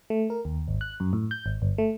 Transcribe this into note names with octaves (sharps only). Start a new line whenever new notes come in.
A3
A#4
D#2
G#1
F#6
F#2
A2
G6
G#1
G1
A3